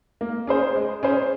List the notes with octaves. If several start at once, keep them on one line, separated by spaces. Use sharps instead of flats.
A#3
C#4 G#4 C5
G#3
C#4 G#4 C5